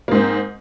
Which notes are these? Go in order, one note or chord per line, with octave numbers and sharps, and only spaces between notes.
G#2 A#3 C4